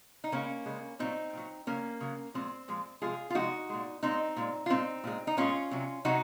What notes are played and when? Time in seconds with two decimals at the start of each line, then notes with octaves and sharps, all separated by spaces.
0.24 D#4
0.32 C#3 G#3 A#3 C#4
0.66 C#3 G#3
0.99 A#2 F#3 C4 D#4
1.33 A#2 F#3
1.67 C#3 F#3 A#3 C#4
2.01 C#3 F#3
2.34 A#2 F3 G#3 C4
2.68 A#2 F3 G#3
3.02 C3 F3 G#3 F4 G#4
3.30 F4
3.35 C3 F3 G#3 D#4 F#4
3.69 A#2 G#3
4.03 A#2 G#3 C4 D#4
4.36 A#2 G#3
4.66 F4
4.70 A#2 G#3 C4 D#4
5.04 A#2 G#3
5.27 D#4
5.37 A#2 G#3 C#4 F4
5.71 C3 F#3
6.05 C3 F#3 D#4 F#4